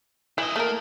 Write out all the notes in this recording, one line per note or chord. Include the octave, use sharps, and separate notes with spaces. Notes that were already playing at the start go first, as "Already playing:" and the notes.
E3 E4 D#5
A3 A#3 A#4